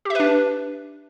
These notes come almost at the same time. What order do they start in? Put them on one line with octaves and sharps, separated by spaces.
G4 E5 B4 D4